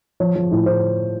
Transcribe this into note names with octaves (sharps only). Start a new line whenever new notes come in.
F3 C#5
F3
A2
A2 C5